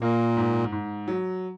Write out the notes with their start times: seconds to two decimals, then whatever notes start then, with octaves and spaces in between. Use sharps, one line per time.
0.01 A#2 A#3
0.37 G#2
0.72 G#2
1.08 F#3